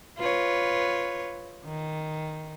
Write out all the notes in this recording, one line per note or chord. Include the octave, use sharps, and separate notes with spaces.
F4 B4 C#5
D#3